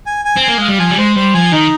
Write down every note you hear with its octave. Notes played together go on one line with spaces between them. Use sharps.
G#5
G#5
C4
G#5
A#3
G#3 F5
G3
F3 G#5
G3
G#3 C5
G3 C5
F3 G#5
D#3 D#4